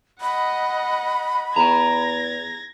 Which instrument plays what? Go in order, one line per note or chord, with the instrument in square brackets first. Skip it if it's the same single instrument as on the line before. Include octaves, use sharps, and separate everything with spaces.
[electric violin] D#5 F#5 [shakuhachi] B5
[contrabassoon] E2 [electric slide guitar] G5 A#5 [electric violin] G#6 A#6